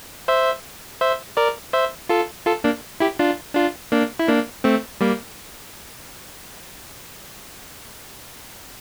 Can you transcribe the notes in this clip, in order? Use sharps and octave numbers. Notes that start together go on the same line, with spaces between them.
C5 E5
C5 E5
A#4 D5
C5 E5
F4 A4
F4 A4
A#3 D4
E4 G4
D4 F4
D4 F4
A#3 D4
E4
A#3 D4
A3 C4
G3 A#3